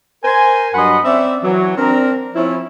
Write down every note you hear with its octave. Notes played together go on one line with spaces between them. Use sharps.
A#4 C5 G#5
G2 F#3 D#5 F#5 B5 C6
C4 C#4 D5 E5
E3 F#3
C4 D4 A#4
F3 C4 C#4 E4